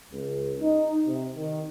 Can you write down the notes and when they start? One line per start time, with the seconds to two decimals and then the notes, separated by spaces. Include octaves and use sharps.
0.11 C#2
0.61 D#4
1.07 C3
1.35 D#3